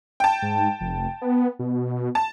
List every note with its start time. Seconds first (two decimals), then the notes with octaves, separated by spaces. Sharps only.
0.20 G5 A5
0.42 G#2
0.81 F1
1.22 B3
1.59 B2
2.15 A5